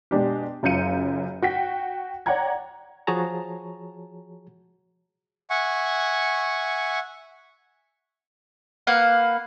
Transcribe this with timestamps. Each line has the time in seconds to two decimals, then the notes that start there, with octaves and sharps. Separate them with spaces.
0.11 B2 G#3 D4 G4
0.63 F#1 F#2 F4 G6 C#7 D#7
1.42 F#4 G5 B6
2.26 C#5 D5 F#5 G5 A#5 G#6
3.07 F3 F#4 G#4 C#5 A5 A#5
5.50 E5 F#5 G#5 C#6
8.87 A#3 B4 F5 F#5